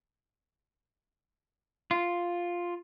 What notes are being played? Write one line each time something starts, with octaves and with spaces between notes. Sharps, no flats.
F4